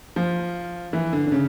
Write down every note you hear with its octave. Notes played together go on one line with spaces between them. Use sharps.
F3
E3
D3
D3
C#3